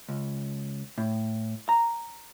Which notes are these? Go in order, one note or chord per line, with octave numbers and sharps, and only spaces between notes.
C#2
A2
A#5